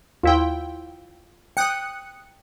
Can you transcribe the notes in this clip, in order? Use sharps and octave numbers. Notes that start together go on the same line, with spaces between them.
D#2 E4 F4 G5
G5 D#6 F#6 C#7